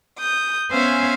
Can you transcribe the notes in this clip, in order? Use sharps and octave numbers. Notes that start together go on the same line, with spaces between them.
D#6 G6
B3 C#4 C5 E5 F5 G#5